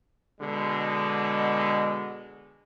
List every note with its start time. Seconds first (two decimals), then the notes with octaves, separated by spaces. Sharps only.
0.40 B2 D3 G#3